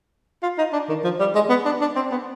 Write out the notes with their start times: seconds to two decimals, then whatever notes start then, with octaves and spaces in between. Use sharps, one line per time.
0.43 F4
0.58 D#4
0.73 D4
0.89 D#3
1.04 F3
1.20 G3
1.35 G#3
1.50 B3
1.65 D4
1.81 D4
1.96 C4
2.11 B3